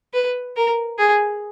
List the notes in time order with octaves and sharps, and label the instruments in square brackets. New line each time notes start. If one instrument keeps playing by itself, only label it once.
[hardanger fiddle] B4
A#4
G#4